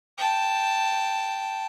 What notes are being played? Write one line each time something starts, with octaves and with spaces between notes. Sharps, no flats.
G5 A5